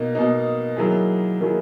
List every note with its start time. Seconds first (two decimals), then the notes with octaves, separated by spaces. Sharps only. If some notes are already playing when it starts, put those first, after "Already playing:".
Already playing: B2 A#3 D#4
0.15 B2 A#3 D#4
0.77 D#3 F#3 A#3 E4 G#4
1.41 D#3 F#3 A#3 E4 G#4